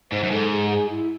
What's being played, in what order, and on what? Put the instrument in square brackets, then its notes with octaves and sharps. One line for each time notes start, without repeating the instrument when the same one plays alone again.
[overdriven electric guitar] G#2 [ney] C5
[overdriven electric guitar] F#2
[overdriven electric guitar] G#2 [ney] A4
[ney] G#4
G#4
E4